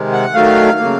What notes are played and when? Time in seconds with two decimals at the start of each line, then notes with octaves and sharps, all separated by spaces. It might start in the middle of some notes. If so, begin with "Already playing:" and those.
Already playing: C3 D#3 G#3
0.12 F#5
0.34 D#3 F#3 A3 F5
0.79 C#3 F#3 A#3